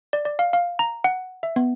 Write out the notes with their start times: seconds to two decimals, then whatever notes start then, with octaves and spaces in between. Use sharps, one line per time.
0.13 D5
0.25 D5
0.39 F5
0.53 F5
0.79 A#5
1.04 F#5
1.43 E5
1.56 B3